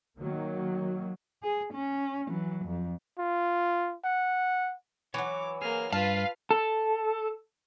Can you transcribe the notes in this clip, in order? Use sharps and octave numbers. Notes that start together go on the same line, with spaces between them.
D#3 F#3 A#3
G#4
C#4
E3 F#3
F2
F4
F#5
E3 F#3 C#5 D6
A#3 G#4 F6
G2 F4 B4 F5 A5
A4